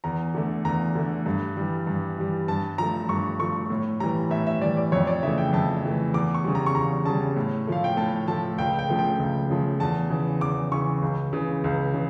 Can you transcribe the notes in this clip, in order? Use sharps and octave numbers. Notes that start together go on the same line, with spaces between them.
E2 A#5
D3 A3
E2 A#5
D3 A3
G2
E3 G3
G2
E3 G3
G2 A5
F3 A3 A#5
G2 C#6
F3 A3 C#6
A2
E3 G3 A#5
A2 E5
E5
E3 G3 D5
D5
F2 C#5
D5
C#3 E3 A3 E5
G5
F2 A5
C#3 E3 A3
E2 D6
C#6
C#3 G3
A#5
C#6
E2 A#5
C#3 G3 A5
A2
F3 A3 F5
G5
A2 A5
F3 A3 A5
C#2 G5
G5
C#3 F3 A3
G5
C#2
C#3 F3 A3
E2 A5
C#3 E3
E2 D6
C#3 E3 C#6
C#2
C#3 E3
C#2
C#3 E3